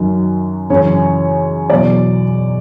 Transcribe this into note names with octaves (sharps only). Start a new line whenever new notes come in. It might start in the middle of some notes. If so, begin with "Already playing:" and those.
Already playing: F#2 D#3 F#3
F#2 C#3 E3 C#5
E2 B2 F#3 D5